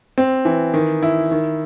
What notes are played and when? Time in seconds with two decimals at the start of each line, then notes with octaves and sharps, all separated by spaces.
0.18 C4
0.45 E3
0.74 D#3
1.02 E4
1.31 D#3